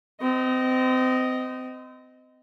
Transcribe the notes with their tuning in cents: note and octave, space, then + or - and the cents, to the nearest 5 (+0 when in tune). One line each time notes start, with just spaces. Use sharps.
C4 -30 D#5 +0